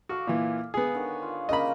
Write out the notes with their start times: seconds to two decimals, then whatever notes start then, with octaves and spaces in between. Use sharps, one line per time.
0.09 F#4 A4 F5 D6
0.27 A#2 E3
0.74 B3 G#4
0.95 D3 D#3 C#5
1.22 F4
1.49 C#3 A#3 D#5 B5